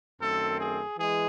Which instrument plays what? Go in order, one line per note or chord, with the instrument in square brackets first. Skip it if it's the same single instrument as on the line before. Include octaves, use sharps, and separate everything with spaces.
[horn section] F#2 D#3 A3 C4 A4
G#4
E3 G#3 G#4